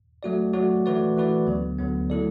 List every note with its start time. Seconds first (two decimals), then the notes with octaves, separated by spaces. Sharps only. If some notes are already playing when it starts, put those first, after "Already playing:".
0.23 F#3 A3 F#4 D5
0.53 F#3 A3 F#4 D5
0.86 E3 A3 F#4 B4 D5
1.17 E3 A3 F#4 B4 D5
1.47 D2 D3 F#3 B3
1.78 D2 D3 F#3 B3
2.10 F#3 A3 E4 A4 D5